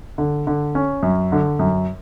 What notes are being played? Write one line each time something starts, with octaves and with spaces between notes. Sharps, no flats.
D3
D3
C#4
F#2
D3
F#2